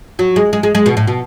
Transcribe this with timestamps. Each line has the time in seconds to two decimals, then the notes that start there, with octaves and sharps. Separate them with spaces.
0.19 F#3
0.36 G#3
0.53 G#3
0.63 G#3
0.75 G#3
0.86 B2
0.97 A2
1.07 B2